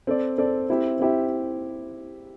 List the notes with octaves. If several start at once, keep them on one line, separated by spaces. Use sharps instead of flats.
C4 A4 D5
C4 A4 D5
C4 E4 G4 E5
C4 E4 G4 E5